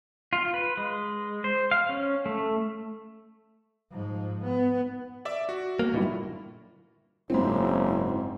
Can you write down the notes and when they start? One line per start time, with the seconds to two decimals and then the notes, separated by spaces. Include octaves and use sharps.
0.33 F4
0.54 B4
0.77 G#3
1.44 C5
1.71 F5
1.89 C#4
2.26 A3
3.91 G#2 F3
4.44 B3
5.25 D5 E5 D6
5.49 F#4
5.79 A#3
5.94 G1 A#2 F#3 E4
7.30 F#1 G#2 C4 E4